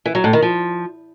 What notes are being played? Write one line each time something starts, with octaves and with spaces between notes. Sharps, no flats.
E3
F#3
A2
D#3
F3